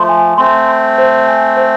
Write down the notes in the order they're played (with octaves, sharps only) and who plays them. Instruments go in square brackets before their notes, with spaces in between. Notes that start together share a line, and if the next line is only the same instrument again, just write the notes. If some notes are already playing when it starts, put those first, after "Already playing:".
Already playing: [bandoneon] F3 A3 [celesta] C6
[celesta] G#5
[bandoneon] A3 C4 [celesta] C6
[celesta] C6
C5
G#5
C5